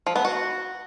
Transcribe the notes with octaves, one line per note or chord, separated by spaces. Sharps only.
F3
B3
F#4